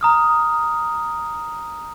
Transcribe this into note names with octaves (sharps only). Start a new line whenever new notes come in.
A#5 D#6 F6